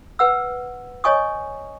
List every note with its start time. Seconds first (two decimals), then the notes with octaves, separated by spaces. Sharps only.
0.19 B4 F#5 E6
1.04 C#5 D#5 G#5 C#6 D#6